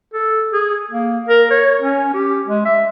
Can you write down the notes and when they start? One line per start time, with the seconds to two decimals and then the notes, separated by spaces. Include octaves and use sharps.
0.14 A4
0.53 G#4
0.91 A#3
1.29 A#4
1.50 C#5
1.82 C#4
2.14 G4
2.47 G#3
2.65 E5